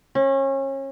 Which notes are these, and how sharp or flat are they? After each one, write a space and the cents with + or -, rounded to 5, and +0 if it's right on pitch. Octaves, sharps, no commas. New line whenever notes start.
C#4 -30